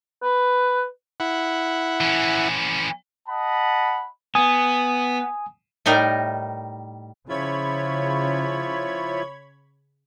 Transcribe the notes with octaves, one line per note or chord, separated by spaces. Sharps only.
B4
E4 F#5
E3 C#4
D#5 F#5 A5 B5
B3 G#5 D#6
A2 G3 D#4 A#4
C#3 F3 E4 F4 C#5 B5 G#6